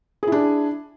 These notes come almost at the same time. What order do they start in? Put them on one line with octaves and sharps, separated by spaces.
G#4 E4 D4